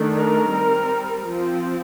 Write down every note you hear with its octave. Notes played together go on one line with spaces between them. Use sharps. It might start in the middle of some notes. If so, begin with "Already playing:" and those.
Already playing: D#3 A3 D4
A#4
G3 C4
F3 C4